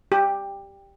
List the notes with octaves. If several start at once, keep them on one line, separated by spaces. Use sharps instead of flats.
G4